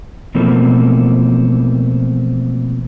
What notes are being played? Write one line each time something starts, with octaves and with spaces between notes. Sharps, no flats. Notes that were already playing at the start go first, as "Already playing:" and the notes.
B2 E3 F3 A3 A#3 C4